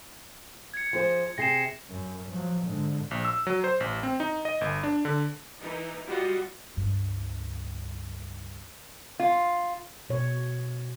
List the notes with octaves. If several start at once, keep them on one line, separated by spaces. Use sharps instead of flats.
G#6 C#7
F3 G#4 C5
C3 G#4 A#6 C7 E7
F#2
F3 F#3
G#2 D3
A#1
E6
F#3
C5
A1
C4
D#4
D#5
G1
D4
D3
E3 D#4
G3 F4 F#4 D#5
C#2 G2
F4
B2 C#5